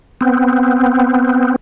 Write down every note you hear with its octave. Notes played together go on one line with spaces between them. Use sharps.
B3 C4